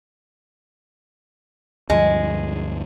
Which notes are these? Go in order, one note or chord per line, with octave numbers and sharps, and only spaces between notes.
D2 G2 F3 G#3